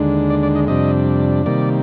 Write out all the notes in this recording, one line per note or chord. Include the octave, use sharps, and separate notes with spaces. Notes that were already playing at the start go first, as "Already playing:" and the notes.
Already playing: D#2 D3 G#3 D4
D5
D5
D#5
F2 C3 G3 D4 D#5
C3 D#3 G3 A#3 D5